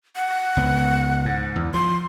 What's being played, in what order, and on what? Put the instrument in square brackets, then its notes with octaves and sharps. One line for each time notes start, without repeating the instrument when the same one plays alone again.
[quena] F#5
[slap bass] C#2 B3
G#2
E2
[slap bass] F3 [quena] C6